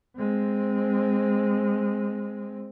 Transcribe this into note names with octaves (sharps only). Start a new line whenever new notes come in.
G#3 C4